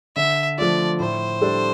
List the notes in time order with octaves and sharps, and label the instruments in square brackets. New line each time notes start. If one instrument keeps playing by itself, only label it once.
[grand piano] D3 [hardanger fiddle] E5
[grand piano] F3 A3 D4 F4 [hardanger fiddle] D5
[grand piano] A2 [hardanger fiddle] C5
[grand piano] G3 D4 A4